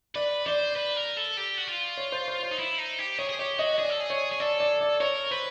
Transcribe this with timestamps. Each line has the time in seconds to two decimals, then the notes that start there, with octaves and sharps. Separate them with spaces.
0.15 B4 D5
0.46 C5 D5
0.76 B4
0.97 A#4
1.17 A4
1.37 G4
1.58 F#4
1.67 F4
1.97 C#5
2.12 C5
2.28 C5
2.43 C5
2.51 D#4
2.59 E4
2.78 D#4
2.99 G4
3.18 G#4 C#5
3.29 G#4
3.39 G4 C#5
3.59 F#4 D#5
3.79 G#4 D5
3.90 A4
4.00 G#4
4.10 C#5
4.32 G#4
4.40 A4 D5
4.60 D5
4.80 D5
5.00 A#4 C#5
5.31 B4 C5